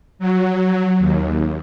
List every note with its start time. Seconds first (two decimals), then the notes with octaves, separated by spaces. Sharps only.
0.19 F#3
0.99 D#2